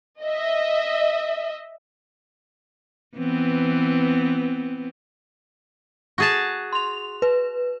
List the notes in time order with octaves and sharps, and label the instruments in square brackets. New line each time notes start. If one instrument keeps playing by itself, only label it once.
[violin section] D#5 E5
[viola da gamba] E3 B3 C4
[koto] F#4 G#4 A5
[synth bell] C6 F7
B4